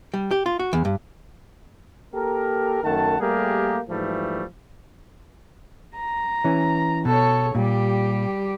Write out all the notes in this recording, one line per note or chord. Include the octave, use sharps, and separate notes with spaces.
G3
G4
F4
F#4
E2
G2
A#3 G4 A4 A#4
F#2 D#3 A3 F#5 A5
G3 A3 A#3 G4 G#4 A#4
G#2 E3 F3 G3 A3
A#5
E3 C#4
B2 A4 C#5
A#2 G3 G4